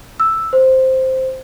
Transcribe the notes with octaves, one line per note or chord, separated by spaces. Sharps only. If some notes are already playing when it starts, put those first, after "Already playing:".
E6
C5